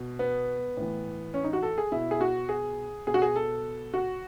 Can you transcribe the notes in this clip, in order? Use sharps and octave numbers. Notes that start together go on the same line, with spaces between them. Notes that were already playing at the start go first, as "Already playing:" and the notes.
Already playing: B2
B3
A2 E3
C#4
D#4
F#4
A4
G#4
B2 E4
G#4
F#4
G#4
B2 G#4
F#4
G#4
A4
F#4